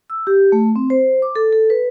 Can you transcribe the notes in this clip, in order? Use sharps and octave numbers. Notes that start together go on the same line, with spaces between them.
E6
G4
A3
C4
C5
D6
A4
A4
B4